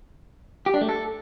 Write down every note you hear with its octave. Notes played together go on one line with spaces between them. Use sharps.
G4
D4
A3
A4